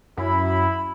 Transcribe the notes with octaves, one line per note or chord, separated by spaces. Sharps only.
F#2 E4 B5